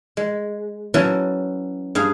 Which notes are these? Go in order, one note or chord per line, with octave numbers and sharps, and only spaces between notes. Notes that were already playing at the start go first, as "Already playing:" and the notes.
G#3
E3 F#3 C#4 F#4 A5
G2 G#4 F5